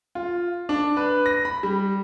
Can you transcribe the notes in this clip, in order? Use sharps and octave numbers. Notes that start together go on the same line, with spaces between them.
F4
D4
B4
A#6
B5
G3